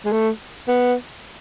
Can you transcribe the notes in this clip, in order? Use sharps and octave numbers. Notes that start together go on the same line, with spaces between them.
G#3
A3
B3